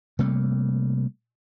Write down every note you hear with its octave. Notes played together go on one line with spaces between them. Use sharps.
C3 G3 A3 A#3